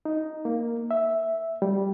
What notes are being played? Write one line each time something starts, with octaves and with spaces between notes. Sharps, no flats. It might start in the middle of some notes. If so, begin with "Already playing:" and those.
D#4
A#3
E5
G3